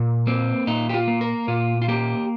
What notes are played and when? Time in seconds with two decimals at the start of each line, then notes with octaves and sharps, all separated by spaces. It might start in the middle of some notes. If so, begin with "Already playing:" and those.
Already playing: A#2
0.27 A#3 C4
0.67 A#2 D#4
0.89 G4
0.94 F4
1.08 A#3
1.21 A#4
1.48 A#2 F4
1.82 F4
1.88 A#3 G4